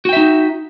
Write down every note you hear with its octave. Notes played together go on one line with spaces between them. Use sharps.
D#4 F#4 E5 G5